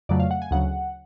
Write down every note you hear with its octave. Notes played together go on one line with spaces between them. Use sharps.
F2 C#3 F#3 A3 D5
F5
F#5
G#5
D2 C#3 F#3 F#5